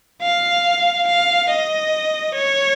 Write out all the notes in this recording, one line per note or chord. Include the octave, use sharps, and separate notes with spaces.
F5
F5
D#5
C#5